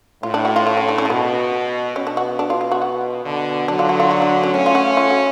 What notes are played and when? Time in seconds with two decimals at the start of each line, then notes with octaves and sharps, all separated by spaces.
0.23 A2 F4
0.34 D4
0.45 F#4
0.56 F4
0.66 F4
0.77 C#4
0.89 D4
0.98 C#4
1.05 A3
1.10 B2 B3
1.96 B2 C#4
2.07 D4
2.17 F#4
2.39 D4
2.50 F4
2.61 F4
2.71 F#4
2.82 F#4
3.25 B2 D3
3.68 D3 F#3 D4
3.79 F4
3.89 F#4
4.00 F4
4.11 F#4
4.22 D4
4.44 C#4
4.54 A3 C#4 D4
4.66 F4
4.75 F#4
4.97 F4
5.10 F#4